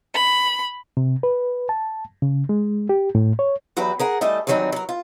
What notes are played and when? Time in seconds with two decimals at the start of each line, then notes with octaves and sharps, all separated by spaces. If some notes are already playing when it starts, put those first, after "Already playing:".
0.13 B5
0.97 C3
1.23 B4
1.69 A5
2.22 C#3
2.49 G#3
2.89 G4
3.15 A2
3.39 C#5
3.77 E2 F#3 F#4 G4 B4 G5
3.99 G#4 A#4 F#5
4.21 E3 G3 A3 A4 D#5
4.47 G2 D#3 E3 F#3 C4 D#4
4.72 F#3 A#4
4.89 F4